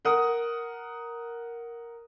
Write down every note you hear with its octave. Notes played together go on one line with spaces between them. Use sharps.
A#4 F#5 D#6